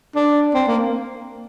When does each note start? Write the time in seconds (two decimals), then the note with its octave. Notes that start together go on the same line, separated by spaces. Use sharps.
0.15 D4
0.54 C4
0.67 A#3